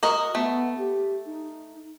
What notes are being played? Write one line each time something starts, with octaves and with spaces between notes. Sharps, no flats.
F#4 A#4 D#5
A3 B3
G4
D#4